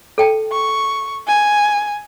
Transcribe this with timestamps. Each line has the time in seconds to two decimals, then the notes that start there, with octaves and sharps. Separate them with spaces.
0.18 A4 G5 A5
0.52 C#6
1.28 G#5